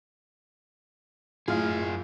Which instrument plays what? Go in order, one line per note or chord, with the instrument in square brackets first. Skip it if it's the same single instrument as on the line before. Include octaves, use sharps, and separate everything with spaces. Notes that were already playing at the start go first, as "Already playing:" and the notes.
[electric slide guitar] F#2 G#4 [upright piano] A2 F5 F6 [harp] F4